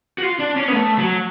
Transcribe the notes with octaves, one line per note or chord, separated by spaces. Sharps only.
F#4
F4
D4
C#4
B3
A3
F#3